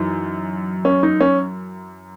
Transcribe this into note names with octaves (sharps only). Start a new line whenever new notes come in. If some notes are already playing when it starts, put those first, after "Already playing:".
Already playing: F#2 E3 D#4
C#4
D#4
C#4